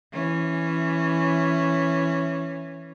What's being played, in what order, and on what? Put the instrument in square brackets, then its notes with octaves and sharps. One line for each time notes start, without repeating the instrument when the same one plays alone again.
[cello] E3 C#4